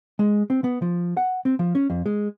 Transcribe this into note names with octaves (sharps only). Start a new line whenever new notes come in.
G#3
C4
B3
F3
F#5
C4
F3
C#4
F2
G#3